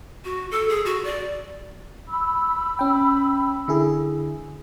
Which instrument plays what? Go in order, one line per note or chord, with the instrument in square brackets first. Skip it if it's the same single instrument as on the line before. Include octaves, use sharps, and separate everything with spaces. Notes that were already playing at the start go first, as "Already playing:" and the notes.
[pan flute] F#4
A4
G#4
F#4
D5
[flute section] B5 E6
[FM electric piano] C#4 G5
D3 E4 G#4